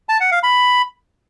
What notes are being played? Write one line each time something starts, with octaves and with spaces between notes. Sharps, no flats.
A5
F#5
F5
B5